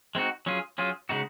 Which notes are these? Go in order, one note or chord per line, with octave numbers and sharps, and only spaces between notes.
G#3 C4 D#4 F#4
F#3 C#4 F4 G#4
F#3 C#4 F4 G#4
C#3 G#3 D#4 F#4